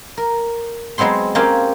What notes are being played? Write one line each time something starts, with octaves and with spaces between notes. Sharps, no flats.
A#4
F#3 G#3 B3 C4 C6
A#3 C4 C#4 G4 F5 G#5